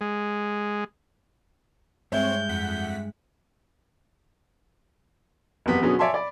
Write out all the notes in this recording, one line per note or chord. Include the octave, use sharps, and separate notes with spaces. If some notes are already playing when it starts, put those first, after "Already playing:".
G#3
G2 G#3 C4 C#5 E5 G6
F2 F#5 B6
F#1 E2 C3 B3 G4 B6
B2 D3 F#3 B3 C#4 G#4
C#5 D5 E5 G#5 A5 C6
D5 B5